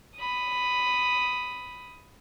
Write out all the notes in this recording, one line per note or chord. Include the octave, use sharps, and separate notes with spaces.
B5 D#6